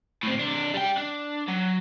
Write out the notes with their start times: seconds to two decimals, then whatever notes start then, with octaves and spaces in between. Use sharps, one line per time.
0.23 A2 C4
0.39 C3 D4
0.74 G3 G5
0.97 D4
1.48 F#3